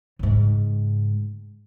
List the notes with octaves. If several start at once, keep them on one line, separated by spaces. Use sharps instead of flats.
G#2 C#3